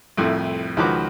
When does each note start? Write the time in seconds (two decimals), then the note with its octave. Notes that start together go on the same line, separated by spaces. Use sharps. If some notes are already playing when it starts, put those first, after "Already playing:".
0.17 C2 F2 A2
0.77 C#2 D#3 F3 F#4 B4 D6